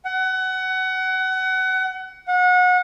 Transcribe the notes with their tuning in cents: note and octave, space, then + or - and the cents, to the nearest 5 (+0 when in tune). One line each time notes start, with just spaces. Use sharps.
F#5 +25
F#5 -30